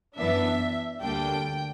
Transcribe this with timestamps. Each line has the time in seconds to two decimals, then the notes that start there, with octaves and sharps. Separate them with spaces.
0.16 F#2 E3 B3 D4 E5
1.01 D2 D3 G3 A#3 D4 G5